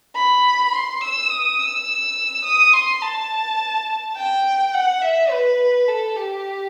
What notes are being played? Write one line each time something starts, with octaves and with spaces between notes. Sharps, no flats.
B5
C6
E6
D#6
E6
D#6
C6
A5
G5
F#5
E5
B4
A4
G4